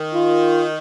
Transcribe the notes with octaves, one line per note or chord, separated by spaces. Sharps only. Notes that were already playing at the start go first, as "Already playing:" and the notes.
Already playing: D#3
F4